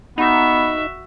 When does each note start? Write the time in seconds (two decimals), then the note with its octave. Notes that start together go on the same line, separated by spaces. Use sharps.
0.18 B3 D#4 F#4 E5